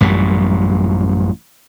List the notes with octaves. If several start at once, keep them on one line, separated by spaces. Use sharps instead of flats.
A1 F#2 A#2 G3